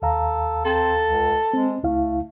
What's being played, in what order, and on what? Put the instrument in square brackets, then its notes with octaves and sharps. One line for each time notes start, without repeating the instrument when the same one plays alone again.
[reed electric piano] D#2 F5 A#5 [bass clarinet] A4
[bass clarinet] C4 [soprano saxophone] A4
[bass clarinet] C#2
[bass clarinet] G#3 [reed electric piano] C4
[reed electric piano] C#2 E4 F5 [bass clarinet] A3